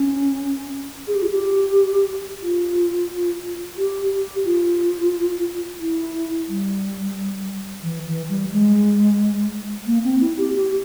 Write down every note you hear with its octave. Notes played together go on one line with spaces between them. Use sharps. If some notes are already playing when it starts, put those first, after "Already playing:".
Already playing: C#4
G#4
G4
F4
G4
F4
G4
G4
F4
E4
G3
E3
E3
G3
G#3
A#3
C4
E4
G4
G4